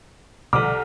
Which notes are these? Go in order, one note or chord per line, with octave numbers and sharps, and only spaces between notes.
C2 B2 D3 F3 A4 D6 F6